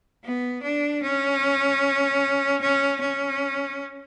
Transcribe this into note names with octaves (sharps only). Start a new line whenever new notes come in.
B3
D4
C#4
C#4
C#4